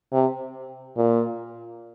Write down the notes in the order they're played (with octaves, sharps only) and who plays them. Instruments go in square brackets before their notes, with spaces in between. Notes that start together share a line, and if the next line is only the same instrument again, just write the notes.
[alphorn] C3
A#2